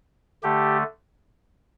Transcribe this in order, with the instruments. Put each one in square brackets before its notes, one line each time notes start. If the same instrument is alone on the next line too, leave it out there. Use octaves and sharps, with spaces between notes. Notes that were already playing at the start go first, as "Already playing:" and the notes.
[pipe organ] D3 A3 G4